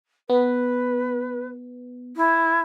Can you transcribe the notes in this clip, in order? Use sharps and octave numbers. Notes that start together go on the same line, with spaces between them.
B3 B4
E4